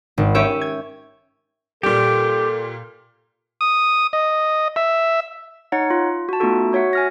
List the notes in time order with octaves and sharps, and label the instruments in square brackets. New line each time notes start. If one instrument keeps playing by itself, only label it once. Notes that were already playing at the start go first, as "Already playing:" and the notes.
[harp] G#1
C#4 G4 C#5 E5
G#6
[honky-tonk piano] A#2 G3 [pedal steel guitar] G4 [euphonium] A4
[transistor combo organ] D#6
D#5
E5
[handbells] D#4 C#5 F#5
F4
F#4 A5
A3 B3 D#4 F4 F#4 A4
F#4 C#5 E5 F#5
G#5 F6 A#6